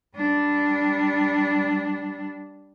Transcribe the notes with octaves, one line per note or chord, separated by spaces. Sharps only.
G3 D4